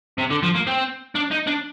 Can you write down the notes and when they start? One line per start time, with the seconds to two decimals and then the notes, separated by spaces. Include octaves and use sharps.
0.18 C3
0.31 D3
0.43 F3
0.55 A#3
0.67 C4
1.15 D4
1.31 D#4
1.47 D4